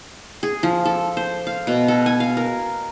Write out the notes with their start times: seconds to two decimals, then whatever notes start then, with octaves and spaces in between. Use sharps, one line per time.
0.43 G#4
0.63 F3
0.85 A4
1.17 C5
1.47 F5
1.67 B2
1.88 A4
2.06 G#5
2.20 F5
2.37 A#4